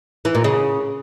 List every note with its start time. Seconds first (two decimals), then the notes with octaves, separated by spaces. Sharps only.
0.25 E3
0.35 A#2
0.44 C#3